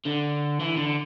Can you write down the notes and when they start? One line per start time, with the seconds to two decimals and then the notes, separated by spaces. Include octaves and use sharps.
0.06 D3
0.60 E3
0.77 D3